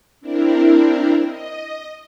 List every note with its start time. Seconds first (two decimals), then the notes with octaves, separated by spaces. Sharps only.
0.21 C4 D4 E4 A#4
1.25 D#5